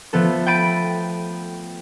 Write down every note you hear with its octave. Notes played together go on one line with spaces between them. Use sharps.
F3 A3 B3 A4
G5 B5 A6 D7 D#7